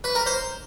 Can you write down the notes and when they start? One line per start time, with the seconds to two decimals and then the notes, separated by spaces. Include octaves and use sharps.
0.04 B4
0.15 A#4
0.26 C5